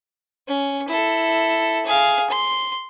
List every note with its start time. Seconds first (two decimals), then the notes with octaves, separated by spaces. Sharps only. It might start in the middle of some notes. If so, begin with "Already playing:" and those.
0.48 C#4
0.88 E4 A4
1.85 G#4 F5
2.30 C6